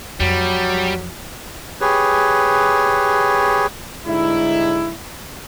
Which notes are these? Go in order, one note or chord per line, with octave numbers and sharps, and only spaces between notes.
F2 F#3 G3
G4 G#4 B4 C#5
G#2 D3 G3 D#4 E4